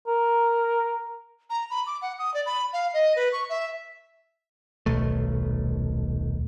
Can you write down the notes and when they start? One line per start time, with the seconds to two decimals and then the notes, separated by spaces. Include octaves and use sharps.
0.07 A#4
1.50 A#5
1.70 B5
1.86 D6
2.02 F#5
2.19 D#6
2.34 D5
2.46 B5
2.73 F5
2.94 D#5
3.16 B4
3.32 C#6
3.50 E5
4.86 D#1 B1 A3